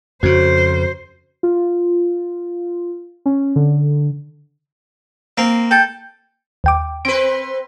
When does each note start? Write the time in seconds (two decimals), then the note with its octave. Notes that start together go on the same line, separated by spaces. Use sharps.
0.23 F2 C#3 F#4 C5
1.43 F4
3.26 C#4
3.56 D3
5.38 A#3 C4
5.71 A4 G5
6.64 D#2 G5 D6
7.05 C4 B4 D7